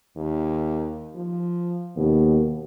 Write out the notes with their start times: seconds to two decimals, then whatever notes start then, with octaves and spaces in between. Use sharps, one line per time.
0.17 D#2
1.16 F3
1.97 D#2 B2